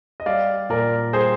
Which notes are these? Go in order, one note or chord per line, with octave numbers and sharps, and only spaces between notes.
D#5
G3 D5 F5
A#2 A#4 D5
G3 G#4 C5